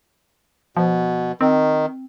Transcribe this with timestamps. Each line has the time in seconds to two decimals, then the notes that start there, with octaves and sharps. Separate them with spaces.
0.77 B2 F3
1.41 D#3 C4